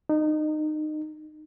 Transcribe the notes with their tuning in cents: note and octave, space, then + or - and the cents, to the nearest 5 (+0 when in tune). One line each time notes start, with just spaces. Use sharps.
D#4 -25